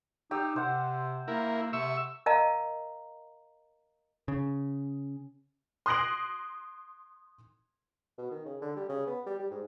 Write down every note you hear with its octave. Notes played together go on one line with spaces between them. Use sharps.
D#4 G4 E6
C3 C5 F#5
A#3 E4 A#4
C3 E5 C#6 E6
A#4 D#5 F5 A5 A#5
C#3
C6 D#6 F#6 A#6 D7 F#7
B2
D#3
C#3
D3
G3
C#3
B3
G3
G3
G#2